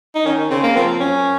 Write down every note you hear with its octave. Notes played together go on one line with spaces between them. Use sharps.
D#4
D#3 C#4
C#3 C4
A#3
F3 C4
F#2 C#4